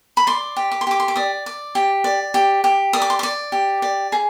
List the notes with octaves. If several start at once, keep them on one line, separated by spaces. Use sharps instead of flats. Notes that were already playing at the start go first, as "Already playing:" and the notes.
B5
D5 C6
G4
D6
C6
G4 D6
C6
D6
D5 D#6
D5
G4
D5
G4
G4
D5 D#6
D6
C6
D5 D6
G4
D5
G#4